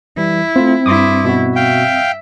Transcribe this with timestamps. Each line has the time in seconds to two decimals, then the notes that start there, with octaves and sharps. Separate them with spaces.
0.17 E3 G3 E4
0.56 A3 C4 F4
0.86 G2 E4 C6 D6 D#6
1.25 B2 F#4
1.56 E5 F5 G5